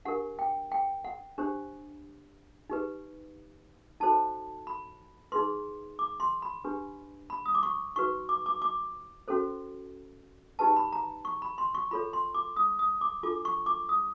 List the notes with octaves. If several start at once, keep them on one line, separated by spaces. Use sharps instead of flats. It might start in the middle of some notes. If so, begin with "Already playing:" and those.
D4 G4 A#4 F#5
G5
G5
F#5
D4 G4 C5
D#4 G4 B4
D#4 F#4 A4 C5 A5
B5
D#4 G#4 B4 C6
D6
C6
B5
D4 G4 B4
B5
D#6
D6
C#6
D#4 F#4 B4 C#6
D6
D6
D6
C#4 F#4 A4 C5
D#4 G4 B4 A5
B5
A#5
C#6
B5
C6
C#6
F4 A4 C#5 B5
C6
D6
D#6
D#6
D6
D4 F4 A4 D6
C#6
D6
D#6